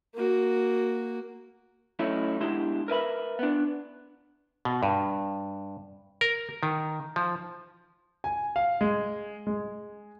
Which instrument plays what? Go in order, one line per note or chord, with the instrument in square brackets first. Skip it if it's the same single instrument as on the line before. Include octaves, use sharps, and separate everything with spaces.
[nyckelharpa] A#3 F#4
[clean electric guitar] F#3 A3 C#4 D#4 E4
B2 G#3 D4 E4 G4 C6
A#4 B4 E5 B5
B3 D4
[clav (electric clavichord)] B2
G2
A#4
D#3
F3
[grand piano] G#5
F5
G#3
G#3